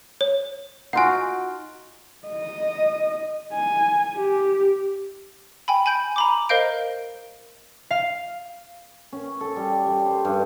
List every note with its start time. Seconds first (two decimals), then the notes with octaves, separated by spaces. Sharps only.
0.21 C#5
0.93 D#4 F4 F#4 F#5 G#5
2.28 D#5
3.53 G#5
4.16 G4
5.68 G5 G#5 B5
5.86 G#5 B5 G6 D7
6.16 A#5 B5 D6
6.49 A#4 C5 D#5 F5 G6 D7
7.91 F5
9.13 C#4
9.41 A4
9.56 G3
9.86 G3
10.06 C5
10.25 G2